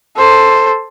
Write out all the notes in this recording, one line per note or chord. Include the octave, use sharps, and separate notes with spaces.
A4 C5